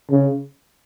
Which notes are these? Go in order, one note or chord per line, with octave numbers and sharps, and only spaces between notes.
C#3